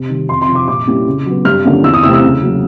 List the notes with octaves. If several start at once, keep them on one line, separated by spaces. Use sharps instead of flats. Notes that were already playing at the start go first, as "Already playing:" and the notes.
Already playing: C3
D#3 G3
F2 C6
C6
C3 F3
D6
A#2 D6
G3 A#3 C#4 E4
C#3
F#3 B3
G2 F6
D3 F3 A#3 C#4
E2 E6
D#6
C3 E3 A3 C4 E6
E6
C#3
F#3 A#3